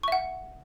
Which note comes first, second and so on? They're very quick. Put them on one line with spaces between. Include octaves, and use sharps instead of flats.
C#6 E5 F#5